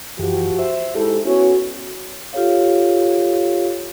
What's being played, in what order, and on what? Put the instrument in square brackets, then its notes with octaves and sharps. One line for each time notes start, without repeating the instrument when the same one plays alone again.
[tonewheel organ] F#2 E3 [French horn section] F3 F#4 G4
[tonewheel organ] C5 E5
[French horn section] G#2 A4 [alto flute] E4 [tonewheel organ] G4
[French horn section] B3 C#4 C#5 [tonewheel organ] E4 [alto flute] F#4
[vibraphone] F4 G4 A4 C#5 F5